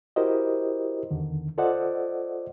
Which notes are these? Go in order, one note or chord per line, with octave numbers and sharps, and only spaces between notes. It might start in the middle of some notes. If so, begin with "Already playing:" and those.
E4 F#4 G4 A#4 C5 D#5
E2 D3 D#3
F4 A4 C5 D5 D#5 F#5